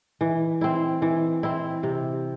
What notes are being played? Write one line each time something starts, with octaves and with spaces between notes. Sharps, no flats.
E3
C4 E4
E3
C4 E4
C3